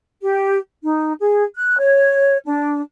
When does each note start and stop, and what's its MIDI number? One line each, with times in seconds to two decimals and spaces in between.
0.22 0.59 67
0.83 1.13 63
1.20 1.43 68
1.55 1.77 90
1.78 2.37 73
2.44 2.81 62